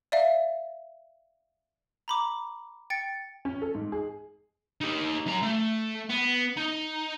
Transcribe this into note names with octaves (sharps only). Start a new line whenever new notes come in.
D5 E5 F5
A#5 B5 D6
G5 A6 C#7
C#4
A4
G#2
G#4
D#4 G4
F#2 A#5
A3
B3
D#4